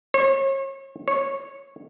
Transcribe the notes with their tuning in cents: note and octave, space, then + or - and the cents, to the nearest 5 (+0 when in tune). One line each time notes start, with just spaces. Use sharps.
C#5 -35
C#5 -10